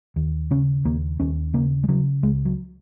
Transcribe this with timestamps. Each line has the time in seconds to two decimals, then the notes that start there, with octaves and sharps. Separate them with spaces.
0.16 D#2
0.51 C#3 C#4
0.85 D#2 A#3
1.20 D#2 C#4
1.54 C#3 A#3
1.83 G#3
1.89 C#3 F#3
2.23 C#2 G#3
2.45 F#3